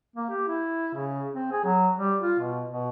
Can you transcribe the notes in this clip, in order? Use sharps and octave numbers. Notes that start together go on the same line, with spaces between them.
A#3
G4
E4
C#3
C4
G#4
F#3
G3
F4
B2
B2